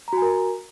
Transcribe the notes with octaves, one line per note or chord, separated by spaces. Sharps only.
F#4 A#4 G#5 A#5